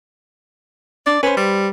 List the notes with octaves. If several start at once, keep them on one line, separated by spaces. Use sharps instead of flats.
D4 D5
C#4 B4 C5
G3